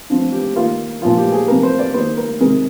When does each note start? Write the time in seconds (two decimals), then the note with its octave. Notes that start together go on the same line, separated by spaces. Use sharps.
0.10 D3 F3 C4
0.32 G4
0.56 D#3 A#3 F4
1.02 A#2 F3 A#3 F4
1.17 G4
1.32 G#4
1.48 C3 F3 A#3 A#4
1.63 C5
1.79 D5
1.94 D#3 A#3 C5
2.17 A#4
2.40 C3 D#3 G#3 A#4